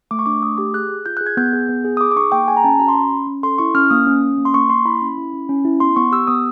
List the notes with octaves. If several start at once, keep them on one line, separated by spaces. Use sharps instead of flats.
A3 D6
C#6
D4 D6
A3 D#6
G4 D6
G#4 F#6
G#4
F4 G6
G#4 F#6
G#6
B3 G6
G#4
B3
G#4
D#6
G#4 D6
D6
D#4 C#6
A#3 G5
G#4 G#5
A#5
C#4 A5
F#4 A#5
C6
C#4 B5
C#4
C#4
A4 C6
E4 C#6
C#4 F6
A#3 D#6
C#4
C#4
A#3
C6
A#3 C#6
A#3 C6
E4 B5
C#4
E4
C#4
C#4
E4
B3 C6
B3 C#6
G4 E6
B3 D#6